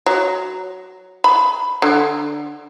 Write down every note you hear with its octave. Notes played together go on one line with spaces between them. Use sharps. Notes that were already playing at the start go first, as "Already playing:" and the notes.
F#3
B5
D3